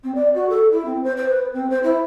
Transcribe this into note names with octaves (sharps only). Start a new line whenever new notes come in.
C4
D5
F#4
A4
E4
C4
C5
C5
B4
C4
C5
E4